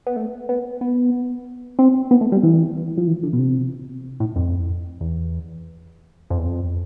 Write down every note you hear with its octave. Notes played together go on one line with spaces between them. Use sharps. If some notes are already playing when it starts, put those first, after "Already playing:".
B3
A3
B3
B3
C4
B3
A3
G3
E3
F3
E3
D3
B2
C3
A2
F2
E2
F2
E2
F2